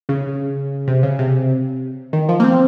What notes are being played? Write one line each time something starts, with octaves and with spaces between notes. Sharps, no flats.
C#3
C3
C#3
C3
D#3
F3
A#3
C4